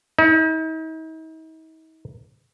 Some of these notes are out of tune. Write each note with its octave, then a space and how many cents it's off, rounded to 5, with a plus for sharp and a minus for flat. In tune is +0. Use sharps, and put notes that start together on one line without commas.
D#4 +45